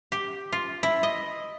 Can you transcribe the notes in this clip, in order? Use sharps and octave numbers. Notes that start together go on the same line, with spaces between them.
G4
F4
E4
D#5